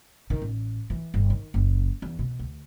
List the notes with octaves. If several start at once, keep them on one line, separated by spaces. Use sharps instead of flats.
D#3
A1
E3
G1
D#3
F#1
E2
B2
D2